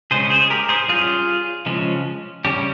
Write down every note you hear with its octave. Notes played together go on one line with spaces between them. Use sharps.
C#3 G#3 C#4 G#4 C5
G#4 C5
G#4
G4 A#4
G#4 C5
G3 C#4 F4 G#4
C#3 F3 G#3 C#4
C#3 G3 C#4 G4